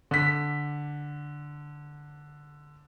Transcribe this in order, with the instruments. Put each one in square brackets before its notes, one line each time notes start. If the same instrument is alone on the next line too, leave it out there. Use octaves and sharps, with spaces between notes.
[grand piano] D3 B6